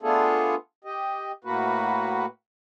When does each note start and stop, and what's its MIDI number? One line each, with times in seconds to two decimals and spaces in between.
0.02 0.55 57
0.02 0.55 59
0.02 0.55 62
0.02 0.55 65
0.02 0.55 68
0.02 0.55 69
0.85 1.32 67
0.85 1.32 75
1.44 2.26 45
1.44 2.26 58
1.44 2.26 66
1.44 2.26 71